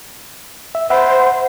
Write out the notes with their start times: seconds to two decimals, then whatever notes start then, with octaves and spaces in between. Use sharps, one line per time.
0.75 E5
0.90 C5 E5 F#5 B5